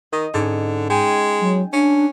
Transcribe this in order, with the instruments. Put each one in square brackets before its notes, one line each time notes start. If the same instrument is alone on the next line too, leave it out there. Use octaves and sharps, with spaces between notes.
[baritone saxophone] D#3 [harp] D#5
[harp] G#2 C#4 [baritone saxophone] D3
[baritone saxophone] G#3 [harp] G5 G#5
[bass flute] F#3
[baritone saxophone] C#4 [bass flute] D4